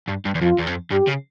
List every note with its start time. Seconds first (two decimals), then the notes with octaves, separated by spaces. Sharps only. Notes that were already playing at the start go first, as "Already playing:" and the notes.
0.08 G2
0.26 G2
0.35 E2
0.41 F2 F4
0.59 E2
0.67 F2
0.91 G2 G4
1.08 C#3